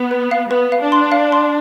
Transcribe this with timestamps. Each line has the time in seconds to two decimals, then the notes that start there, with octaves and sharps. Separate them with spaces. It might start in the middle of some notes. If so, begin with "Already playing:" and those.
Already playing: B3
0.11 B4
0.31 F5
0.51 B3 B4
0.72 F5
0.82 D4
0.92 C6
1.12 F5
1.32 C6